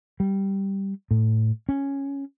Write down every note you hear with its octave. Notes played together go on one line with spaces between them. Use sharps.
G3
A2
C#4